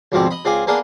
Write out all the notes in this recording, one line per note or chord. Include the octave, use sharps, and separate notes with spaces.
D2 G#2 B2 F3 C4 D5
D#5 B5
C#2 C4 F4 G#4 D5 G#5
A#3 B3 D4 G#4 A#4 D#5